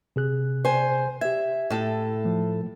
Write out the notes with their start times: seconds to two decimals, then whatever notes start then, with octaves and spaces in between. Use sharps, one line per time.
0.16 C3 G#4 F#6
0.65 C5 G#5
1.21 G4 E5 G#6
1.70 A2 A4
2.24 F3 A3